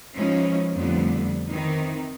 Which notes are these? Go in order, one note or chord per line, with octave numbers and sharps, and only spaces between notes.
F3 G#3 C#4 D#4 E4
F2 D3 F3 G3 A3 B3
D#3 E3 C4 D#4